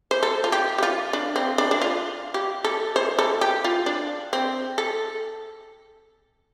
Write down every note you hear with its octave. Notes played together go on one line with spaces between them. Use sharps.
C5
A4
F4
G4
G4
F4
D4
C4
D4
D4
F4
G4
A4
C5
A4
G4
F4
D4
C4
A4